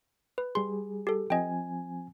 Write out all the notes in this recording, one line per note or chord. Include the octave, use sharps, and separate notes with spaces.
B4
G3 G#4 C6
G4 A4
F3 C4 D#5 G5 G#5